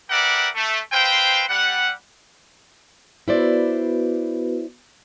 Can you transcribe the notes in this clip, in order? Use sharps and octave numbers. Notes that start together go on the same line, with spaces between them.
G4 A#4 B4 D5 E5 F#5
A3
C4 B4 C5 F5 G5
G3 F#5
B3 E4 F#4 B4 C5 D5